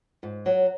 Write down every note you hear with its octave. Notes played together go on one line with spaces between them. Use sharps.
G#2
F#3